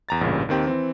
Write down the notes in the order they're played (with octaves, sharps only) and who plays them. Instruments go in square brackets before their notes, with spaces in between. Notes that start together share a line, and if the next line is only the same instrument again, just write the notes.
[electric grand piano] E2 A#5 A6
A1 G2 A#2 C#3
D#2 D#3 C4 G4
E3 C4